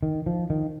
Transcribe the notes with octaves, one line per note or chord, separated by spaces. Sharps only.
D#3
F3
D#3